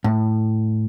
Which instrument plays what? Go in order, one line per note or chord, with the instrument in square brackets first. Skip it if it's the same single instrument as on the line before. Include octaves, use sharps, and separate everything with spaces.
[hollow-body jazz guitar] A2